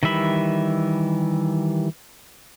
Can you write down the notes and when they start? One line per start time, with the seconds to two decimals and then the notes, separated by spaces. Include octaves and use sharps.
0.03 D#3 E3 G3 E5 B5